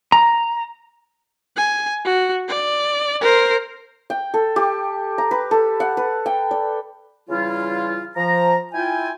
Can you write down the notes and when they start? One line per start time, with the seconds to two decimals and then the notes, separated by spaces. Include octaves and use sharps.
0.12 A#5
1.57 G#5
2.05 F#4
2.48 D5
3.21 A#4 C5
4.10 G5
4.34 A4
4.56 G4
5.18 A#5
5.31 B4
5.51 A4
5.80 F#5
5.97 B4
6.26 G5
6.51 D5
7.29 C#3 E3 G3 E4 F4
8.16 F3 A#5
8.74 E4 F4 G5 G#5